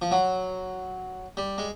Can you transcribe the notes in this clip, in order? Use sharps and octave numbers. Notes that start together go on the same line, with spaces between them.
F3
F#3
G3
G#3